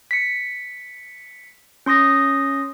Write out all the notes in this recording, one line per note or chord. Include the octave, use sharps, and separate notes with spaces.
B6 C#7
C#4 C6 D#6 A#6